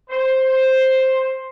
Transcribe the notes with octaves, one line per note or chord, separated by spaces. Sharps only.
C5